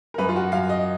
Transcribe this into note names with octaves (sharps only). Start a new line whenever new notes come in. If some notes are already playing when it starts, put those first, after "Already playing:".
A#4
F#2 B4
F4
F#4
F#2 F5
D#5